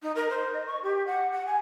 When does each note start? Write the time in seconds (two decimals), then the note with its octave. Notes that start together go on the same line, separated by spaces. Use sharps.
0.02 D#4
0.15 A#4
0.29 C5
0.53 D#5
0.67 C#6
0.83 G4
1.06 F#5
1.31 F#5
1.46 G#5